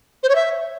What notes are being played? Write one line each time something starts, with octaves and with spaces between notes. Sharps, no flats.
C5
C#5
E5